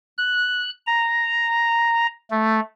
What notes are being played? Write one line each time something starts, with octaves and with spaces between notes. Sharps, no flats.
F#6
A#5
A3